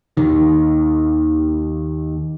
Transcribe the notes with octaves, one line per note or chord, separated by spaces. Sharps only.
D#2 D#3